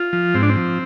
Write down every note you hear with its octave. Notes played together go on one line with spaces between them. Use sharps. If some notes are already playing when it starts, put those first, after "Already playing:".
Already playing: F4
F3
G#2 C4
D4
C4
F3